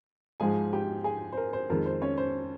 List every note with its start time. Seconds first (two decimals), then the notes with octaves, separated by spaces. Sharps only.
0.40 G#2 F3 G#3 G#4 G#5
0.73 G4 G5
1.04 G#4 G#5
1.32 C5
1.37 A#4
1.53 C5
1.70 F2 D#3 G#3 A#4
1.86 C5
2.02 C#4 C#5
2.18 C5